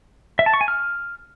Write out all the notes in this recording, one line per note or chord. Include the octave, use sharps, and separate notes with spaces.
E5
A5
C#6
G#5
F6